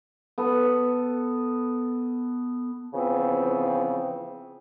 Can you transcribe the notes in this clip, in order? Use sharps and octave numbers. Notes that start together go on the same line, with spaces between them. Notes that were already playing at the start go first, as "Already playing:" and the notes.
B3 A4
C#3 E3 F3 B3 C4